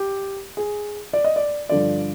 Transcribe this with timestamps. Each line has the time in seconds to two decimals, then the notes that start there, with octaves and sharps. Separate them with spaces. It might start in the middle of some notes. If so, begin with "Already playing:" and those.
Already playing: G4
0.57 G#4
1.13 D5
1.24 D#5
1.36 D5
1.69 G2 D3 F3 D5